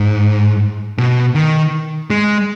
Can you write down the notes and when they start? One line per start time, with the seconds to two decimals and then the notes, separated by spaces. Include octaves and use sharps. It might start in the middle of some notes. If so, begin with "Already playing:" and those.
Already playing: G#2
0.98 B2
1.35 D#3
2.10 G#3